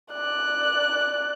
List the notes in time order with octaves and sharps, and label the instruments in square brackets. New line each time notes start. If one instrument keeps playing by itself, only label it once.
[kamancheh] D5 F#6